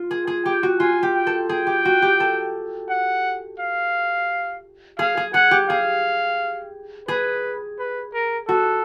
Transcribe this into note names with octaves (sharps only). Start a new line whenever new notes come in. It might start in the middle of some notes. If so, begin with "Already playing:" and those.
Already playing: F4
G#4
G#4
G4 G5
F#4
F4 G#5
G4
G5
A4
G#4 G5
G4
F#4
G4
A4
F#5
F5
G#4 F5
G#4
G#4 F#5
G4
G#4 F5
G#4 B4
B4
A#4
F#4 A4